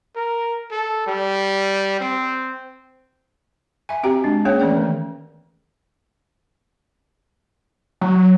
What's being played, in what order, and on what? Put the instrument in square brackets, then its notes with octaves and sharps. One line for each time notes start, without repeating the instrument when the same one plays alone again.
[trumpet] A#4
A4
G3
C4
[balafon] E5 G#5
C4 F#4 G4 G5 A#5
G#3 D4
A#3 B3 C#4 G#4 C#5 G5
E3 A3 C#4 D5 G5
D#3
[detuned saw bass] F#3